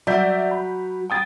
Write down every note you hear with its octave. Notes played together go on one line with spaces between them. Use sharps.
F#3 D5 E5 G6
B5
G5 D#6 A6